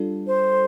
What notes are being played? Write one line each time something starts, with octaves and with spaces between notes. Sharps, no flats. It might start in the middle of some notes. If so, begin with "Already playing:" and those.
Already playing: G3 D4 F4 A4
C5